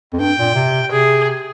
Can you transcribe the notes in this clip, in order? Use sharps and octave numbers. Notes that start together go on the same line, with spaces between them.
F2
G2 G5
A#2
C3
C3 G#4